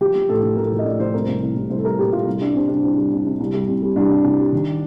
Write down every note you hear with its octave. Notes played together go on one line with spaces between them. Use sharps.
F3 G4
F3
A2 A4
F3
A2 A#4
F3
D#5
A2 D5
F3 C5
C2 A#4
C2
C2
C2
C2 C5
A4
G3 A#4
A#2 G4
G3 F4
C2
G3 D4
C3 C4
G3 D4
C2 C4
G3
C2
C3
C2
G3
C2
G3
C2 D4
C2
C2
G3
D#3